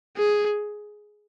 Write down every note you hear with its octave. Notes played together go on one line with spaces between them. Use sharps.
G#4